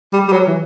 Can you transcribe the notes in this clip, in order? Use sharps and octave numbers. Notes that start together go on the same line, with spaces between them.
G3
G3
F#3
E3